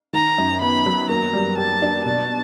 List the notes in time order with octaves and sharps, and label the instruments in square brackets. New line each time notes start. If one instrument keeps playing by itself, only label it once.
[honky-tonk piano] D#3 [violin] A#5
[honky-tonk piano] F#2
[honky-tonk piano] B3 [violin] B5
[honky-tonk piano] F#3
[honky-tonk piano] A#3 [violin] A#5
[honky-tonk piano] G3
[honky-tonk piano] G4 [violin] A5
[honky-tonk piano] D4
[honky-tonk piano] B2 [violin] A5